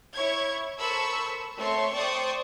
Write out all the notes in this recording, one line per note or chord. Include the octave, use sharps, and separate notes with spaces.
E4 C#5 C#6 G#6
A4 A#4 C5 B5 C#6 E6
A3 C4 C#5 C6 C#6
C5 D5 G5 C#6 D#6 A6